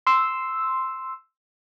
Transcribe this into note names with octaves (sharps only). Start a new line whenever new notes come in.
C6 E6